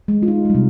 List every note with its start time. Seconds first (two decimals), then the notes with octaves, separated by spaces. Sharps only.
0.08 G#3
0.23 F4
0.28 D#4
0.45 G#3
0.50 G3
0.55 C3